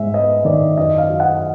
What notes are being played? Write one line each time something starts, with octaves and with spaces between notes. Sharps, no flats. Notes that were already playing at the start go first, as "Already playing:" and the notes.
Already playing: G#2 G#3 E5
B3 D#5
D#3 D5
F#2 D#5
F5
F#3
F#5